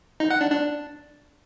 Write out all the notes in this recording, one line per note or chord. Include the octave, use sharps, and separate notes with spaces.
D#4
F#5
D4
D4